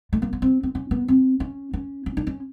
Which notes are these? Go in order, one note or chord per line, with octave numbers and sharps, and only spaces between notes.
A3
A#3
B3
C4
C4
C#4
B3
C4
C#4
C#4
C#4
D4
C#4